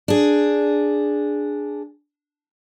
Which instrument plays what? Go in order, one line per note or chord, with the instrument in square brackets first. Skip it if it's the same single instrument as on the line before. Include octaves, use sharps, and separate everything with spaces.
[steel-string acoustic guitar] D4 G#4